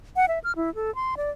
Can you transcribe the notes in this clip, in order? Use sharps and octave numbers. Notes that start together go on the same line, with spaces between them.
F#5
E5
F6
E4
A4
C6
D5